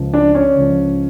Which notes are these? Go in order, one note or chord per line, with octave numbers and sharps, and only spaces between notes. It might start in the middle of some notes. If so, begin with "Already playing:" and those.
Already playing: C#2 C#3 F3
D4 D5
C#4 C#5
C#2 C#3 F3